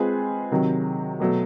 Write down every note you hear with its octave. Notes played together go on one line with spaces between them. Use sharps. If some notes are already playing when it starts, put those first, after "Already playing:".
Already playing: G#3 C4 F4 G#4 B4
C3 D#3 F#3
B2 F#3 A3